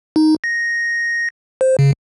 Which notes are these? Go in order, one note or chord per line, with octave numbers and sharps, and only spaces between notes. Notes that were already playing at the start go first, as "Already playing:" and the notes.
D#4
A#6
C5
C#3